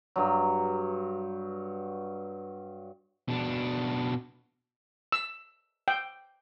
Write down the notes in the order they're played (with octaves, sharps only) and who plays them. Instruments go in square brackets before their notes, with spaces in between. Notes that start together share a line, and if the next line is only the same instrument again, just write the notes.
[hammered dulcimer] G2 F#3
[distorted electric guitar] B2 D4
[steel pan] E6
G5